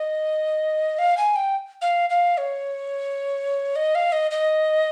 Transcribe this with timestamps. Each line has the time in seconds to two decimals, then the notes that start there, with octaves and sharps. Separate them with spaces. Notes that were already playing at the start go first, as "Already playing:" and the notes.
Already playing: D#5
0.99 F5
1.17 G#5
1.36 G5
1.82 F5
2.10 F5
2.38 C#5
3.76 D#5
3.95 F5
4.12 D#5
4.31 D#5